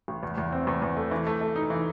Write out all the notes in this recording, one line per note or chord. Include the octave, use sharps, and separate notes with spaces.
A1
E2
E2
C4
E2
E2
A3
E3
A3
A3
D#4
E3